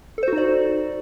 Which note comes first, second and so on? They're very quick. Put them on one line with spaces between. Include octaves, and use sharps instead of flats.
A4 C5 F#4 D#4 D5